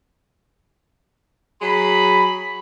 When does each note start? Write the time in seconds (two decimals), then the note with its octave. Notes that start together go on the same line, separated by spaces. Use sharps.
1.61 F#3 G#4 B5